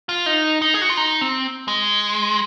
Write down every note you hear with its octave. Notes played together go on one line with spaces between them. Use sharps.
F4
D#4
D#4
G#4
F#4
F4
D#4
C4
G#3